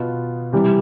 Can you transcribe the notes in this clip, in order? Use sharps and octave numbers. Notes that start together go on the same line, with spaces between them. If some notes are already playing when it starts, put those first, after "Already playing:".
Already playing: B2 B3 F4
C3 E3 G3